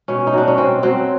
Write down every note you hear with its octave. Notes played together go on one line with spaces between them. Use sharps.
B2 C#4
D#4
F#3 D4
C#4
B2 C4
F#3 C4